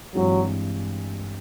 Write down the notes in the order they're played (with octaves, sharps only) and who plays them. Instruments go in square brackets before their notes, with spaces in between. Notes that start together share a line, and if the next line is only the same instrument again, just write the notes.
[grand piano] G2 E3 G#3 C4 [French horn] F#3